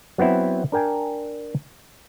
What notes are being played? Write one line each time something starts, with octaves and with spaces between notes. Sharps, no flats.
F#3 B3 C4 E4
D4 A#4 G5 G#5